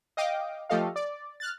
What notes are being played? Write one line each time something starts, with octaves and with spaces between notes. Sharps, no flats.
D#5 F5 G5 D6
F3 A3 G4 A4 D#5 F5
D5
F6 F#6 A6